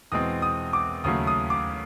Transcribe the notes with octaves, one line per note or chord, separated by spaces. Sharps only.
E2 B2 G#3 C4 D#6
D#6
D6
D#2 C#3 F#3 A3 D#6
D#6
D6